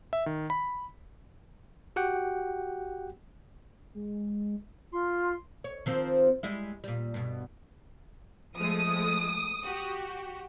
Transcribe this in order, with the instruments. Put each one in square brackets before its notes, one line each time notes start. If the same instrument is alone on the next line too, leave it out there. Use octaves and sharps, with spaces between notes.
[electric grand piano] E5
D#3
B5
[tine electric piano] F#4 G4 F#5 G5
[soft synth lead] G#3
[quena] F4 [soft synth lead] C6
[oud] C#5
D#3 F3 C4
G3 G#3 E4
A#2 G3
G2 B2
[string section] F3 G#3 A3 [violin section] D#6
[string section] F#4 G4